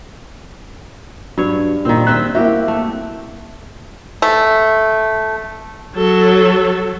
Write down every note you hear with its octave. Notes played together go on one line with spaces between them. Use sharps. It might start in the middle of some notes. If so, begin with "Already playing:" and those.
G2 F#3 C#5
A#2 D#3 C4
C4 D#5 E5 F#6
A#3 E4 F#4 G4 E5
A3
A3
F#3 A4